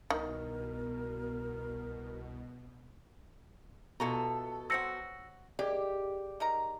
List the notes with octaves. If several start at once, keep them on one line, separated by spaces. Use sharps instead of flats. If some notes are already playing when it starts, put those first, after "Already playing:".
C2 B2 D#3 A#4
B2 E3 F4 A4 A#5
F#3 C4 F#4 E6 A#6 C#7
D#3 G4 G#4 D5
D#4 A#4 A#5